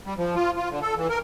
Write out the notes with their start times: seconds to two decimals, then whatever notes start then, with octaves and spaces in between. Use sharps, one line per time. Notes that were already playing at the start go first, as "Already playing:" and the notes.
0.06 G3
0.18 F3
0.36 F4
0.57 F4
0.70 D3
0.82 A4
0.97 E3
1.10 A#4